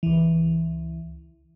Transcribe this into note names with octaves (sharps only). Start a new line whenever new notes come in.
C#2 E3